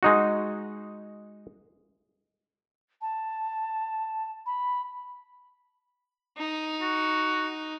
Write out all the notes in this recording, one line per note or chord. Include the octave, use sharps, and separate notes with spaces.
G#3 D#4 F#4
A5
B5
D#4
F#4